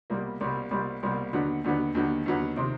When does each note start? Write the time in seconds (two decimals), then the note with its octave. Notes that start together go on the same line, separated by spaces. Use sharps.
0.10 C2 B2 G3 A#3
0.41 C2 B2 G3 A#3
0.71 C2 B2 G3 A#3
1.03 C2 B2 G3 A#3
1.33 D#2 D3 F#3 B3
1.64 D#2 D3 F#3 B3
1.95 D#2 D3 F#3 B3
2.26 D#2 D3 F#3 B3
2.56 C3 D#3